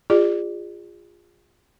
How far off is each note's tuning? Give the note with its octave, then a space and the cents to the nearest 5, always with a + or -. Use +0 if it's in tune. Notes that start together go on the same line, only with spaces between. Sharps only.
F4 +0 G#4 -30 D5 +25